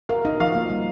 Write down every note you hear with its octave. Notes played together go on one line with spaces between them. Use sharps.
A#4 F5
D#4 D#5
F3 F5
A#3
G3